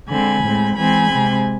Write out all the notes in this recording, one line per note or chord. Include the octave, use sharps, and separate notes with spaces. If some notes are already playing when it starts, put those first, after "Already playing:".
D3 G#3 C4 G#5 B5
A2 G#3 C4
E3 G#3 C4 G#5 B5
C3 G#3 C4